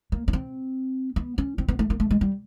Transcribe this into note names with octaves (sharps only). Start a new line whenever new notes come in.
A#3
C#4
C4
B3
C#4
C4
B3
A3
A#3
A3
G#3
G3